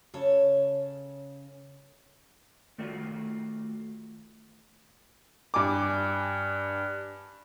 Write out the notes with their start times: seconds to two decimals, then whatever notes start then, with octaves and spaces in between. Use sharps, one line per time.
0.14 C#3 A4 C#5
2.78 D#3 A3 F4 F#4 D5
5.54 G2 G#5 D6